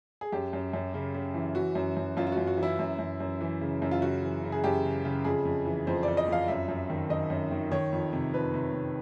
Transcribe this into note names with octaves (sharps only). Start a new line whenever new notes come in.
G#4
F#2 G4
F#2
F#2
C#3
C#3
E3
E3 F#4
F#2
F#2
F#2 F4
F4
F#4
F#2
F#4
E3
E4
F#2
F#2
F#2
E3
C#3
F#2
F4
C#3 F#4
E3
C#3
G#4
F#2 G4
C#3
C#3
F2 G#4
F2
E3
F2 C5
D5
F2
D#5
F2 F5
F#2 E5
F#2
D#3
D#3 D#5
F#2
D#3
D#3 C#5
F2
C3
F2 B4
C3
C3